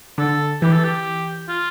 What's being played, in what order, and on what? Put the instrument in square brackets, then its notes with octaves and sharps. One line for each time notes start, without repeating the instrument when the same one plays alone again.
[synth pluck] D3 [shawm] A4
[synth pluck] E3 [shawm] G4
[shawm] A4
G4
F4